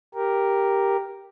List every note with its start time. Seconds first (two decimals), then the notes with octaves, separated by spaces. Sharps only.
0.15 G4 A#4